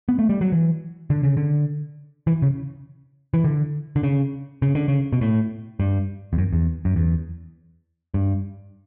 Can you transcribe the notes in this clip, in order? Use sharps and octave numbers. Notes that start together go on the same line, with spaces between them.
B3
A3
G3
F#3
E3
D3
C#3
D3
E3
C#3
E3
D3
D3
C#3
C#3
D3
C#3
B2
A2
G2
E2
F#2
E2
F#2
E2
G2